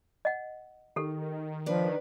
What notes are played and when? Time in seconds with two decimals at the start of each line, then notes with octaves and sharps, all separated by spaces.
0.25 D#5 F#5
0.96 D#3 G4 A4
1.66 F3 D4 B4